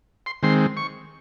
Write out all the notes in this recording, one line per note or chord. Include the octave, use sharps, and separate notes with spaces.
C6
D#3 G#3 C4 C6
C#6